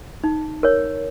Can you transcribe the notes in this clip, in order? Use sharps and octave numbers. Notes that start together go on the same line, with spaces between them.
D#4
A#4 C#5